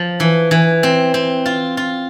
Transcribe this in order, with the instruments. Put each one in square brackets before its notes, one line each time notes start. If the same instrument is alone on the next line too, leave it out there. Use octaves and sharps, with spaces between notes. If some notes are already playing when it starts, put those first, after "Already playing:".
Already playing: [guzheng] F3
E3
E3
C4
C4
F4
F4